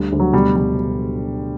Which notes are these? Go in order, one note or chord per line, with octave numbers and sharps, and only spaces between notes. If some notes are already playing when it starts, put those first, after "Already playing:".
Already playing: D2 D3 G3
D2
F#3
B2 G3
G3